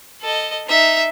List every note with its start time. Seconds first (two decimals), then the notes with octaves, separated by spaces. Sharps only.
0.21 A4 D#5
0.67 D#4 E5